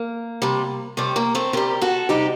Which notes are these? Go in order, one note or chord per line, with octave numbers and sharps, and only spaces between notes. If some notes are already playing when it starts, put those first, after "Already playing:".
Already playing: A#3
C3 G3
C3 G3 A3
A#3
A3 C4
C3 G3 G4 A#4
F#4 A4
C3 G3 D#4 G4